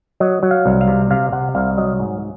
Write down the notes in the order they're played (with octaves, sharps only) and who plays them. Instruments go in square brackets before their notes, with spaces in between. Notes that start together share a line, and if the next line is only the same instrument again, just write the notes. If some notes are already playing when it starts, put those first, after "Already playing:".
[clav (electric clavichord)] F#3 D#5
F#3
F5
C2
F5
C3
C3 F5
C3 F#5
C2 F5
F#3 D#5
G#2